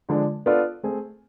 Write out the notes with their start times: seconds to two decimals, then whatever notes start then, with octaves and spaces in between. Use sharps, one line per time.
0.09 D3 F3 G#3 D4
0.46 B3 D4 F4 A4 D5
0.83 A3 C4 G#4